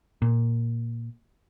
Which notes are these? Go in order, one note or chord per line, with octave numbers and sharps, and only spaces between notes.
A#2